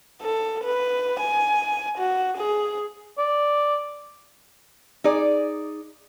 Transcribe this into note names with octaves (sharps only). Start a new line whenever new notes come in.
A4
B4
G#5
F#4
G#4
D5
D#4 G#4 D5